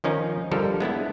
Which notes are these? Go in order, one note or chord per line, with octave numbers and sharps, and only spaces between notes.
D#3 F3 C#4 D#4
D3 F3 G3 A4 A#4
G#3 B3 D4 E4